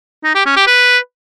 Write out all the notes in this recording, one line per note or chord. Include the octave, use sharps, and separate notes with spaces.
D#4
G4
C#4
G4
B4